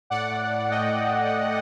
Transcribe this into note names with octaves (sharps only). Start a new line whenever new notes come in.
A2 D5 F#5
A2
A2
A3 D#5 G5
A2
A3
A3